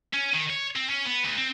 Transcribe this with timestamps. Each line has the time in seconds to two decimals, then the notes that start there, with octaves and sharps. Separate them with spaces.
0.14 C#4
0.34 D#3
0.50 C#5
0.76 C4
0.90 C#4
1.05 B3
1.24 D2
1.37 C4